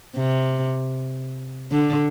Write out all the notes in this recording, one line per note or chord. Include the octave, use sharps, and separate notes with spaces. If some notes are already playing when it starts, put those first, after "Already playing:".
C3
D3